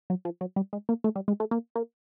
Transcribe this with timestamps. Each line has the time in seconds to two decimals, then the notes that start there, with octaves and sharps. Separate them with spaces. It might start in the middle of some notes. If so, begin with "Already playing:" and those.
0.10 F#3
0.25 F3
0.41 F#3
0.56 G3
0.73 G#3
0.89 A#3
1.04 A3
1.16 G3
1.28 G#3
1.40 A3
1.51 A#3
1.76 A#3